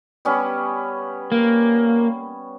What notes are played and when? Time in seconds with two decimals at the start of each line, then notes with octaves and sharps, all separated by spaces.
0.25 G3 B3 C#4
1.32 A#3